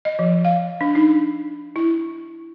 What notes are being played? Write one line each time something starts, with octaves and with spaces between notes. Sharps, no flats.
D#5
F3
F5
D4
D#4
E4